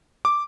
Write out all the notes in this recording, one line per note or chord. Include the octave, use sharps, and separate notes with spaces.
D6